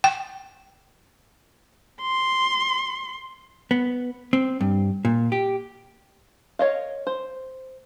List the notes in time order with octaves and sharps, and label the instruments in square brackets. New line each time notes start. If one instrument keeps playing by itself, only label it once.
[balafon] G5
[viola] C6
[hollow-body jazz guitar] B3
C4
G2
A#2
G4
[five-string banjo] A#4 C#5 D#5 F5
C5